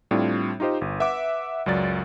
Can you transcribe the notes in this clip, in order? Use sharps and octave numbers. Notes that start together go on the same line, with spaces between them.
A2 G3 C4 D4 F4
D#4 F4 G4 C5 D#5
G1
B4 E5 F#5 D6
C#2 F#2 F#3 D5 A6